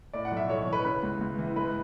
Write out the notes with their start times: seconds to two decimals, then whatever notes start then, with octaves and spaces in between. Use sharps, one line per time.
0.13 A2 D5
0.25 F#5
0.32 B1
0.37 E5
0.49 B1 C#5
0.61 C#5
0.67 E3
0.73 B4
0.85 C#3 B4
1.03 C#2
1.21 C#2
1.39 E3
1.56 G#2 B4